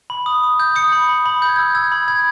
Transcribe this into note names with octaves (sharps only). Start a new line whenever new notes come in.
B5
D#6
D#6
G6
D#6 C#7
B5
B5
B5
G6
G#6
E6 G6
E6 G#6
B5
B5 G#6